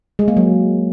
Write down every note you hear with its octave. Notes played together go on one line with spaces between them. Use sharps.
G#3
A#3
F#3